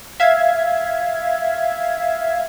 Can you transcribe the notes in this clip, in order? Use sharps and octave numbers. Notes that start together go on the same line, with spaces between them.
E5 F5 G#6